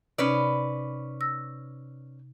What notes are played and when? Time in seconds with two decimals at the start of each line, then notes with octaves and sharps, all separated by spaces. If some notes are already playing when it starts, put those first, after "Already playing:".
0.18 C3 C#4 D#4 B4 D5
1.21 E6 A#6